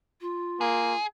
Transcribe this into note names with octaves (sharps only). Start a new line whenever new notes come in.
F4
A#3 G#4